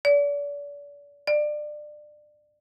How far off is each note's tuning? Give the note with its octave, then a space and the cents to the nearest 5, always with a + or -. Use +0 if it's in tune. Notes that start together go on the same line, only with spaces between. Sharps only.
D5 -35
D5 +25